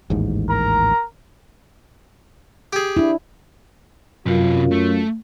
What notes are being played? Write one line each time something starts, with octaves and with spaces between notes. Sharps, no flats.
A1 D#2 G#2
A#4 A#5
G4 G#4
D4 E4
F#2 C3 F4 B4
A3